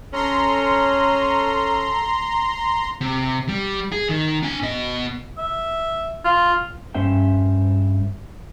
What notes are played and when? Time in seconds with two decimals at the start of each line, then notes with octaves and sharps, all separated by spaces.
0.13 C#4 A4 A#5 C6
3.01 C3
3.49 G3
3.92 G#4
4.09 D#3
4.43 D4 G#5
4.62 B2 D#5
5.38 E5
6.24 F4
6.94 G2 C#4 C5 E5 G5